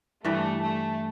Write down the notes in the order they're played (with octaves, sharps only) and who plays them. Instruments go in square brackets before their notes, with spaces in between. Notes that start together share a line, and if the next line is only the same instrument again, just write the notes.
[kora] G2 E3 G3 [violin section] A3
[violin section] A3